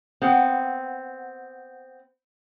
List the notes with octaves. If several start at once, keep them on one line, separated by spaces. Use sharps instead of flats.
B3 C4 F#5